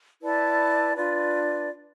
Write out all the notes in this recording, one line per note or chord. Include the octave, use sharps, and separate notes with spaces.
E4 B4 D5 A5
D4 F4 B4 D5